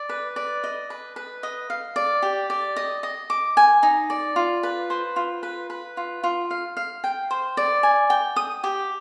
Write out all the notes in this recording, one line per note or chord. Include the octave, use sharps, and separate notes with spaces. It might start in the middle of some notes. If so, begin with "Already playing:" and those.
Already playing: D5
B4
D5
D#5
B4
B4
D#5
F5
D5
G4
D5
D#5
D#5
D6
G#5
D#4
D5
F4
B4
C5
F4
B4
B4
F4
F4
F5
F5
G5
C5
D5
G#5
G5
D#6
G4